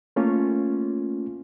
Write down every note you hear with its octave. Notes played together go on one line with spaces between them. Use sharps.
A3 A#3 C#4 F4